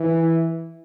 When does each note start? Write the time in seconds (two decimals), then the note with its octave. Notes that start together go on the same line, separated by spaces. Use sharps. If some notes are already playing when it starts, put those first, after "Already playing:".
Already playing: E3